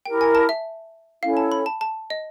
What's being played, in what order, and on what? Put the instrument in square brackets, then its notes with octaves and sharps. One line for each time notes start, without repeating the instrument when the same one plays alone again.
[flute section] E4 G4 A#4 [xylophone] G5
[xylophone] G#5
A5
E5
[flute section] C#4 E4 A4 C#5 [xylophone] F5
[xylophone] A5
B5
A5
A5
D#5